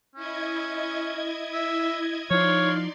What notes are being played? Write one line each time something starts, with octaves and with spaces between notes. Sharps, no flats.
C#4 E4 D#5 G#6
E5
F3 D#4 C#5 D5 F5 C6